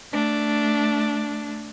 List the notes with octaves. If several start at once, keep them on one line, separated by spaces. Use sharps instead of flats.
A3 D4